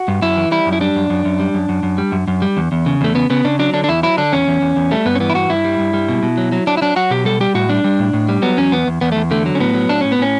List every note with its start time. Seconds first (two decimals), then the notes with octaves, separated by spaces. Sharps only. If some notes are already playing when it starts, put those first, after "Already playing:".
Already playing: F#4
0.08 G2
0.22 F#2 E4
0.37 E3
0.51 G3 E4
0.66 F#2
0.72 E4
0.81 G3 D4
0.96 F#2
1.10 F#2
1.25 F#2
1.40 G3
1.54 F#2
1.69 F#2
1.83 F#2
1.98 G3
2.12 F#2
2.28 F#2
2.42 G3
2.57 E2
2.72 E2
2.86 C#3
3.01 E2 A3
3.15 C#3 B3
3.30 C#3 B3
3.45 C#3 D4
3.59 F#3 D4
3.74 D3 D4
3.84 D4
3.88 E2 E4
4.03 F#3 E4
4.17 D3 D4
4.32 E2 C#4
4.48 E2
4.62 E2
4.76 E2
4.91 G3 A3
5.05 G2 B3
5.15 C#4
5.20 E3 B3
5.30 E4
5.35 G2 F#4
5.50 G2 E4
5.65 G3
5.79 G2
5.93 G3
6.09 B2
6.23 B2
6.37 F#3
6.52 F#3
6.67 F#3 D4
6.77 E4
6.82 F#3 D4
6.96 F#3 F#4
7.10 B2 G4
7.25 G3 A4
7.40 G3 G4
7.55 A2 F#4
7.69 G3 D4
7.84 G3
7.99 A2
8.13 A2
8.29 G3
8.42 F#3 B3
8.57 E2 C#4
8.72 E2 B3
8.87 E2
9.01 E2 B3
9.12 E2 A3
9.31 D3 A3
9.46 F#3
9.55 C#4
9.60 A2 B3
9.74 F#3
9.89 A2 D4
10.01 A2 C#4
10.12 B3
10.19 A2 C#4